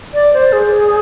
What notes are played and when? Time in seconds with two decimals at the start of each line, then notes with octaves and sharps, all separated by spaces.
0.14 D5
0.33 C5
0.53 G#4